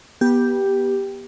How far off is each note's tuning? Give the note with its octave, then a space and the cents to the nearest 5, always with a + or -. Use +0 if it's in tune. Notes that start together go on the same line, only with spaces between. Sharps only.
B3 -25 G4 +0